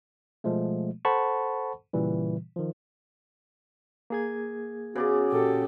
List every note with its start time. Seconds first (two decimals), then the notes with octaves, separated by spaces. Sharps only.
0.44 B2 F3 G#3 A3
1.05 A4 C5 F#5 A5 B5 C#6
1.93 A#2 C#3 E3 G3
2.56 D#3 F3
4.10 A#3 G#4 G#6
4.96 C#3 B3 F#4 D5 D6
5.32 A#2 G4 A4